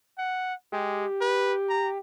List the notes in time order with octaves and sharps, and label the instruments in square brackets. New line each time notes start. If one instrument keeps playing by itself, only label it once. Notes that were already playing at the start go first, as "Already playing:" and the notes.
[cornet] F#5
[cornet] G#3 [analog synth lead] G4
[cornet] B4
A#5